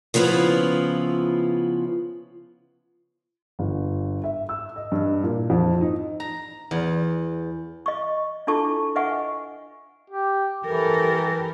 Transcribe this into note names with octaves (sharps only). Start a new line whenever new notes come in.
C#3 F3 B3 E4 F4
G1
E5
E6
D#5
G2
A#2
F2
D#4
A#5
E2
D#5 C#6
D4 E4 F4 A4 A5 C#6
B4 D#5 E5 F#5 G#5 C#6
G4
E3 G4 A4 A#4